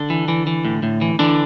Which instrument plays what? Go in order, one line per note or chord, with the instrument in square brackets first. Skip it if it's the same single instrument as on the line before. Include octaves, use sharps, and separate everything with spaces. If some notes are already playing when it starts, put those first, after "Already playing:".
Already playing: [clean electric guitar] D3 D4
E3
E3
E3
A2
A2
E3
D3 E3 D4